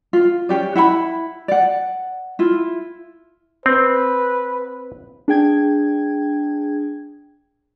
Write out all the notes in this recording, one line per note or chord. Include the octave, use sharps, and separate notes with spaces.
F4
C#4 D4 G4 D5
E4 F#5 G5 B5
D5 F#5
E4 F4
C4 B4
D4 G#4 G5 G#6